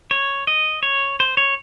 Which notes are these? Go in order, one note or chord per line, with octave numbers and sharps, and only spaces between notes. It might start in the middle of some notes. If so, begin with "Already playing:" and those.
C#5
D#5
C#5
C5
C#5